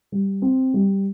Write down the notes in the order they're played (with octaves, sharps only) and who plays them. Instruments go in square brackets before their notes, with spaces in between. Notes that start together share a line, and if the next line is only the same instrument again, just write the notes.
[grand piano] G3
C4
G3